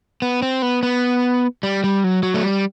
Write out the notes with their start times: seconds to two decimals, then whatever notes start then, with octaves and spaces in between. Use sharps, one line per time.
0.22 B3
0.42 C4
0.62 B3
0.83 B3
1.63 G3
1.84 G3
2.04 F#3
2.23 F#3
2.34 A3
2.43 G3